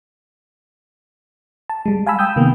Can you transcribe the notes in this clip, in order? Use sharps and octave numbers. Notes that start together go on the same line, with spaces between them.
A5
G3 G#3
F5 G#5 A5 B5 E6
G5 D#6 E6 G6
C3 D#3 A#3 B3